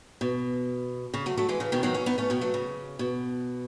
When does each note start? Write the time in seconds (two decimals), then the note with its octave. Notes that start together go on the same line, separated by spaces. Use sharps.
0.21 B2
1.14 C#3
1.26 F#3 A3
1.37 F#3 A3
1.49 E3 G#3
1.60 C#3 E3
1.72 B2 D#3
1.83 D#3 F#3
1.94 C#4 E4
2.06 B3 D#4
2.18 A3 C#4
2.30 B2 D#3
2.41 F#3 A3
2.54 C#3
2.99 B2